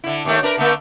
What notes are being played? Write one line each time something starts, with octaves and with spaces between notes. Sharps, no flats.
D3 E4
D#2 D#3 A3
D4 A#4 B4
D3 A3 A#3